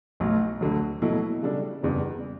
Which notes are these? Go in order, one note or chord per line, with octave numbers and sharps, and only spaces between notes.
B1 A2 F#3
D2 D3 F#3
B2 F#3 A3 E4
C#3 G3 D4 A4
F#1 E2 C#3 G3 D4